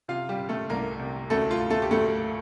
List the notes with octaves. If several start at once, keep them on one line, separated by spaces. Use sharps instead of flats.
C3 F4 F5
G3 G4
G3
A3 A4
C2 A#3 A#4
C3
D2 A3 A4
F4
D2
A3 A4
G4
D2 A3 A4